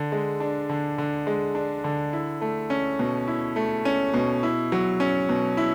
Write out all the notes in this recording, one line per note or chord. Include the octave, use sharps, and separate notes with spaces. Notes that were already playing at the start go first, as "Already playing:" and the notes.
Already playing: D3
G#3
D4
D3
D3
G#3
D4
D3
E4
A3
C#4
B2
E4
A3
C#4
B2
E4
F#3
C#4
B2
E4